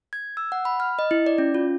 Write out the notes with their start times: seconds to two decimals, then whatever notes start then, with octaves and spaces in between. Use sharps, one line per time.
0.13 G#6
0.37 E6
0.52 F#5
0.65 B5
0.80 F6
0.99 D#5
1.11 E4
1.26 D5
1.38 C#4
1.55 F4